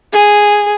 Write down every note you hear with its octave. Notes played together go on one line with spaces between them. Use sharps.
G#4